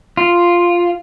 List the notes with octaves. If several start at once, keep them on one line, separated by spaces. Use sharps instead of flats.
F4